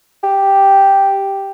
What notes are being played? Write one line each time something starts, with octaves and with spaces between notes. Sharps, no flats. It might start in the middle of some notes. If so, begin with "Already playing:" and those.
G4